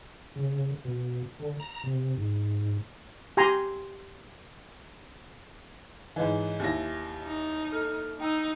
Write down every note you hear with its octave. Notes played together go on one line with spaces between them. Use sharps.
C#3
B2
D3
A#5
C3
G#2
G4 G#5 A#5 C6
G#2 E3 C#5 D#5 G#5
D#2 E4 G4 G#5 A#6
D#4
A4 F6
D#4 G5 A#5 E6